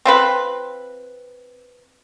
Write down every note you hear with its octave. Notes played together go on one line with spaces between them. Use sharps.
C4 F4 B4